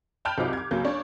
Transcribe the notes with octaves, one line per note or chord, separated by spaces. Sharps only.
G5 A5 B5 F6 G6 D7
C2 F#3 C4 D#4 F4 D6
D6 G#6
C#2 F#3 A#3 G6
D4 C#5